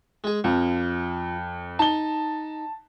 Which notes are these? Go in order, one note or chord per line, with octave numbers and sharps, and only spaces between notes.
G#3 G#4
F2 F3
D#4 A5 G7